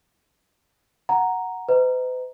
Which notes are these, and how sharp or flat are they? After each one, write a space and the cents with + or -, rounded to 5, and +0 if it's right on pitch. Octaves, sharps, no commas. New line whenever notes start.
F#5 +0 A#5 +0
B4 +45 D#5 +15 A#5 +0